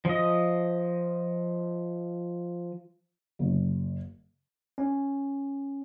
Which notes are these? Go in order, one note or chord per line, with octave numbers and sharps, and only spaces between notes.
F3 D#5
F#1
C#4